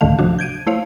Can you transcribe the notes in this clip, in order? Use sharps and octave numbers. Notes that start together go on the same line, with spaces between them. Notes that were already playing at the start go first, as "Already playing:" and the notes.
C#2 G#2 D3 D#3 A3 F5
C3 F3 D4 F#4
G6 G#6 D7 D#7
A3 E4 C5 C#5 F5